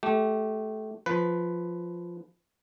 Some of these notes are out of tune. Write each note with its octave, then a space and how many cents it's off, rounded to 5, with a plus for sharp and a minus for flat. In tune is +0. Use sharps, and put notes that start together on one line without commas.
A3 -20 G4 -30
F3 +0 B4 +10